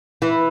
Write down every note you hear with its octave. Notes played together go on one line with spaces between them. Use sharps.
E3